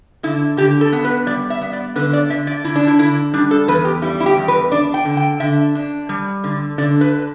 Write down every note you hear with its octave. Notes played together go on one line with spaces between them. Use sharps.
D3 E4
D3 G4
A4
B3
B4
G3 D5
E5
B3
D5
D3 B4
D5
D3 E5
D5
D3 E4
D4
E4
D3 E4
G3 D4
A4
E2 B4
G4
G3 E4
E4
G4
E2
B4
D4 D5
G5
D3
G5
D3 E5
D4
G3
D3
D3 D5
B4